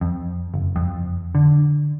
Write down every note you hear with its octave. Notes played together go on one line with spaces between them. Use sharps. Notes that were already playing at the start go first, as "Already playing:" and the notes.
F2
F#1
F2
D3